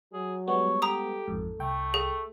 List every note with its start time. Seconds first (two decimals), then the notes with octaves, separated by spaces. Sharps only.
0.13 F#3 G#4
0.48 G3 G#3 B3 C#5
0.82 G4 A4 A#5 D#6
1.27 A1 F2 G#2
1.59 C2 A3 G5
1.94 G#4 A4